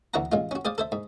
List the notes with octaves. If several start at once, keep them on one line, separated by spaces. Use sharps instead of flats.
D2 E3 D4 F#4 F#5 A#5
A1 G#3 F4
C#4 F#4
G#4 C5 D5 F5
A4 C5 E5
G#2